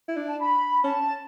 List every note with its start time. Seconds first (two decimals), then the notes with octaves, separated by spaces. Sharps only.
0.08 E4
0.17 D4
0.27 A5
0.39 B5
0.84 C#4 A5